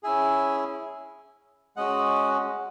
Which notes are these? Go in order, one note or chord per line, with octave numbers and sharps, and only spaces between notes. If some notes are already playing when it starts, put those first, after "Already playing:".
C#4 E4 G#4 E5 G#5
G#3 C#4 F#4 D#5 F#5